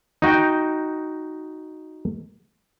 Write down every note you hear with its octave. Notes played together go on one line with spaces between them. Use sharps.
D#4 F#4 D#5 G5